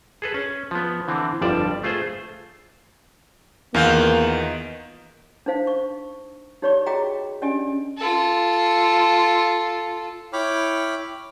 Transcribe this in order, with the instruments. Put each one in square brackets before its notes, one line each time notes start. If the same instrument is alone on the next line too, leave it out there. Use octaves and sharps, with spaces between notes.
[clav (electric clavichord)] G#4 A4 B4
C#4
F3 B3
D3 E3 C4
G1 F2 F3 G3 D5 A5
A3 F4 G#4 C5
[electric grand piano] E2 F5 G6 [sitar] D#3 F4 [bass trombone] A#3 [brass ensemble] B3
[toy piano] D4 D#4 C5 F5
C#6
D#4 G4 C#5 D5 B5 C#6
F#4 G#4 D#5 G5 A#5
C#4 D4 G4 D5 D#5 G#5
[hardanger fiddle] F4 A4
[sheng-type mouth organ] E4 C#5 G5 B5 D6 F6